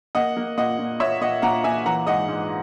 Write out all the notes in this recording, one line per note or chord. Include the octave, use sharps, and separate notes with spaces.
A#3 D#5 F#5
A#3
A#2 D#5 F#5
A#2
A#2 C#5 E5
A#2 D#5 F#5
A#2 F#5 A#5
A#2 E5 G#5
E3 F#5 A#5
G#2 D#5 F#5
G#2